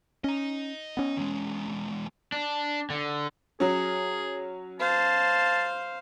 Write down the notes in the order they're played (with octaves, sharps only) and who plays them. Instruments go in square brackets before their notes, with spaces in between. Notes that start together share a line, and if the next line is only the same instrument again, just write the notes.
[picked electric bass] C#4 [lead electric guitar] D#5 A#5
[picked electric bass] B3 C#4
[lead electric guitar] E2 G#3
[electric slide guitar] D4
D3
[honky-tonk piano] F#3 C#4 [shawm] G#4
[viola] C5 F5 [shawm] A5